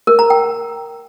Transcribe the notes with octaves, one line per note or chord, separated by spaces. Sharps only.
A#4
A#5
G5